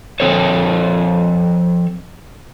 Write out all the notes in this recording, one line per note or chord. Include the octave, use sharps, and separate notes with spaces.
F3 C4 A4 C#5